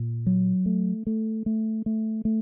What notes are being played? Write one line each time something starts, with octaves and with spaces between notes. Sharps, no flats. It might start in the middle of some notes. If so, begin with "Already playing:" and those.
Already playing: A#2
F#3
A3
A3
A3
A3
A3